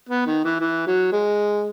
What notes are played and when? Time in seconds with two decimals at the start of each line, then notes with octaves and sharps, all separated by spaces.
0.09 B3
0.26 D#3
0.44 E3
0.60 E3
0.87 F#3
1.12 G#3